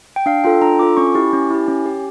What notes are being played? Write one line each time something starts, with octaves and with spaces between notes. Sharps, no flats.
G5
D4 F5
F4 A4 G5
D4 A#5
F4 A4 D6
C#4 C#6
E4 G4 C#6
C#4
E4 G4
C#4
G4